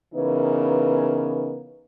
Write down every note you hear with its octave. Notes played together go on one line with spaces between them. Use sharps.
C#3 E3 B3 D#4 A#4 B4